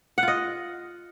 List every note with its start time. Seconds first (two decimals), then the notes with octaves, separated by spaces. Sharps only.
0.18 F#5
0.23 F4
0.28 D#5